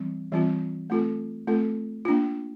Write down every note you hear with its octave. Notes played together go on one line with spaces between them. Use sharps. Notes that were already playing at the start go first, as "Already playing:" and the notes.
Already playing: E3 G3 C4
E3 G3 C4 F4
A3 C4 F4 A4
A3 C4 F4 A4
A#3 D4 F4